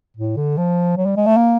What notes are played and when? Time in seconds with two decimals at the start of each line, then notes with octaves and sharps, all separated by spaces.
0.17 A2
0.36 D3
0.57 F3
0.97 F#3
1.06 G3
1.17 G#3
1.26 A3
1.37 A#3